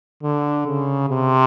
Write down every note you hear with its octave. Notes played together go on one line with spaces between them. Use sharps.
D3
C#3
C3